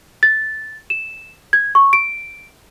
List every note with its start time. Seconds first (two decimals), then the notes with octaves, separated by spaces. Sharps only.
0.23 A6
0.90 E7
1.53 G#6
1.75 C#6
1.93 D7